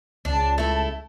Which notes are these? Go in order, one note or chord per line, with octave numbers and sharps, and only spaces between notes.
C#2 D4 A5
A3 E4